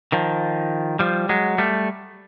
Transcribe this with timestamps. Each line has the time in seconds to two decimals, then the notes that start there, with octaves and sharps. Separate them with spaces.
0.12 D#3 F3
0.99 F3 G3
1.29 F#3 G#3
1.58 G3 A3